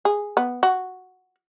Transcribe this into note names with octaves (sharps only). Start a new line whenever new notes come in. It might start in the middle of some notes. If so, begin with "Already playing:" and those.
G#4
B3
F#4